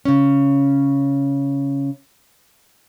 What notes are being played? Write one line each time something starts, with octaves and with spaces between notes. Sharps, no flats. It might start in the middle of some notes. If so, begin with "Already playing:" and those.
C#3 C#4